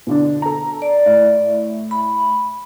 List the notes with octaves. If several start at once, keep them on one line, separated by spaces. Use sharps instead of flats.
B2 D3 D4
A4 A#5
D5
A2
B5